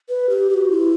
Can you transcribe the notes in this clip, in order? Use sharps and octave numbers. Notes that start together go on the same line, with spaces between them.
B4
G4
G4
F#4
E4